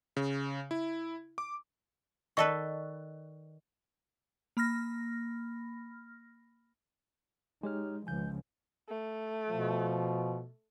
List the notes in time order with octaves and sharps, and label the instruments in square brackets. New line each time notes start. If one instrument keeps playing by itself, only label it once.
[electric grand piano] C#3
E4
D6
[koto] D#3 A4 B4 [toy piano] D5 D#5 C#6
[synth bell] A#3 B5 F6 A#6
[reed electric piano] G#3 [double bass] D#4 [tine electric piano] G4 C#5 F6
[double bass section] C#2 [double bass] F3 [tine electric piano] G#5 G6
[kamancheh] A3
[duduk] B2 [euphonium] F3